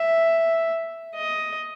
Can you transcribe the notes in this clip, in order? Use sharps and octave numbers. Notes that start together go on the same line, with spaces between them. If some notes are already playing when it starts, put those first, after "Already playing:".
Already playing: E5
D#5